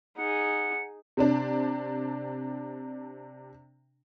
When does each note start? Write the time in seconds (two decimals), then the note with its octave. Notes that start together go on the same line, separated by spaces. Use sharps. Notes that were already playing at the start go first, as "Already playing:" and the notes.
0.18 D#4 G#4 F#5
1.17 C3 C4 D4